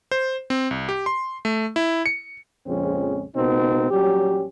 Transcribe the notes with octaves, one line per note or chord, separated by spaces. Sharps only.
C5
C4
C2
G4
C6
A3
E4
C#7
A#1 F2 C#3 G#3 C4 C#4
C#2 B2 A#3 C4 D#4
A#1 F#3 G3 C#4 G4